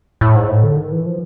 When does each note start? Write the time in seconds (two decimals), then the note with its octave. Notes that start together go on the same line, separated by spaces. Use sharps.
0.21 A2
0.35 G#2
0.48 A2
0.63 D3
0.77 D#3
0.91 E3
1.06 F3